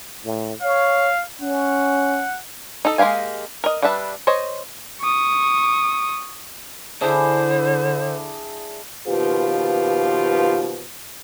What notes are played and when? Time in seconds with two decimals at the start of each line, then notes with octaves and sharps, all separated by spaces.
0.25 A2
0.62 C#5 F5
1.41 C#4 F#5
2.85 D#4 A4
2.98 G#3 A#3 G4 F5 G#5
3.64 A#4 D#5
3.82 G3 D4 B4 E5 A5
4.27 C5 C#5 D#5
5.01 C#6 D#6
7.01 D3 D4 E4 G#4 C5
9.08 D#2 B2 F3 F4 G4 B4